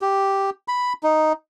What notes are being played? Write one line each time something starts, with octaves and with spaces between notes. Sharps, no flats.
G4
B5
D#4